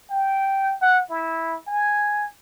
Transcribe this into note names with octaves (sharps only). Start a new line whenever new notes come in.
G5
F#5
E4
G#5